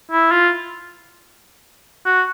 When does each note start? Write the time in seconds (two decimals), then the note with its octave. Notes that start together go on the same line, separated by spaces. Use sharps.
0.11 E4
0.31 F4
2.06 F#4